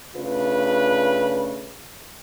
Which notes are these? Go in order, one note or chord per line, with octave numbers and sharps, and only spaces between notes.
C#3 A3 D4 F4 B4